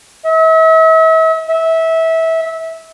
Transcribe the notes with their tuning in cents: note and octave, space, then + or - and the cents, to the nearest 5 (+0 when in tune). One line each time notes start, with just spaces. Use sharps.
E5 -40
E5 -20